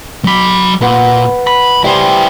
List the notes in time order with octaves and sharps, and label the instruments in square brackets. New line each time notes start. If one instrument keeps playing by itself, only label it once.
[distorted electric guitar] F#3 B5
[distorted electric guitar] A#2 [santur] B4 F#5
[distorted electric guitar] B5
[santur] G3 G#5 [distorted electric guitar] E4 C5